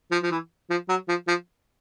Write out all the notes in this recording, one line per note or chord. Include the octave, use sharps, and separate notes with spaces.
F3
F3
E3
F3
F#3
F3
F3